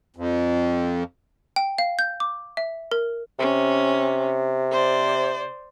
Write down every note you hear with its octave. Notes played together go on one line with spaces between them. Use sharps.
F2
G5
F5
G6
D6
E5
A#4
C3 C#4
C5 D5